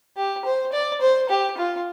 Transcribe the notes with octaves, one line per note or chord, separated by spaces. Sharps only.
G4
C5
D5
C5
G4
F4